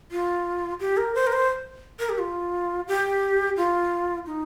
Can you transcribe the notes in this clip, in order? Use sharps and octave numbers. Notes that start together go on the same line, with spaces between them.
F4
G4
A#4
C5
A#4
C5
A#4
G4
F4
G4
F4
D#4